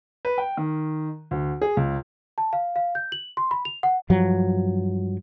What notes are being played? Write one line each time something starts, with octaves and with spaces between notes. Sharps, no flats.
B4
G5
D#3
D2
G#4
C#2
A5
F5
F5
G6
F#7
C6
B5
F7
F#5
G2 F3 F#3